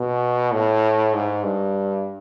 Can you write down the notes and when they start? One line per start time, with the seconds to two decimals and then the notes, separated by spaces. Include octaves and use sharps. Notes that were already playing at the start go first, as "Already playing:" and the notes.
Already playing: B2
0.52 A2
1.14 G#2
1.44 G2